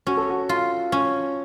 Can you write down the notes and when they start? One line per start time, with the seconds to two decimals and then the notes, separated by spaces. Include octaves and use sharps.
0.07 C#4 F#4
0.17 A4
0.30 F#4
0.49 F4
0.92 C#4